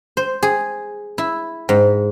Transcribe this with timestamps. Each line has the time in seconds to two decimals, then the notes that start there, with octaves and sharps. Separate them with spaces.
0.17 C5
0.43 G#4
1.18 E4
1.69 G#2